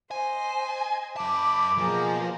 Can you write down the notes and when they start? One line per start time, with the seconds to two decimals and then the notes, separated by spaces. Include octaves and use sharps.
0.11 C5 D#5 G#5
1.17 F#2 A5 B5 D6
1.78 B2 F3 A#3 G#4 A#5